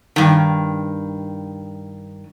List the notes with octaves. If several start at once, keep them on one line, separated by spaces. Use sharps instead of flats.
G2 D#3